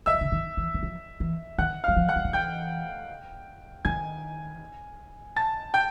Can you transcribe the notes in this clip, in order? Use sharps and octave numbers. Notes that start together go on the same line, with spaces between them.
D3 E5 E6
D#3
D3
D#3
E3
E3
F3
E3
D#3 F#5 F#6
F#3 F5 F6
F3
F#5 F#6
F#3
F3
E3 G5 G6
D#3 G#5 G#6
A5 A6
G5 G6